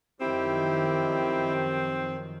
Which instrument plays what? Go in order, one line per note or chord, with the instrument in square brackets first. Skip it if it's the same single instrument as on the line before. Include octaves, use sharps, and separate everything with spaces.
[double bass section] F#2 D#3 F3 [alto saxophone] C4 [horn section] D#4 G4 [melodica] E4